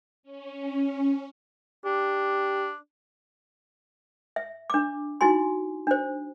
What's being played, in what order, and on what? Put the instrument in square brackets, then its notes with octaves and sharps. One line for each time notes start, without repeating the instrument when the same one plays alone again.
[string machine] C#4
[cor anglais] D4 [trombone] G4
[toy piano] E5
D4 D6
D#4 E4 F#4 G#5 C6
D4 C5